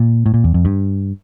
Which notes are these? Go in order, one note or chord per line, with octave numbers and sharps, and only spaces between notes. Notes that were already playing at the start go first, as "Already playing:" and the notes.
Already playing: A#2
A2
A#2
E2
F2
G2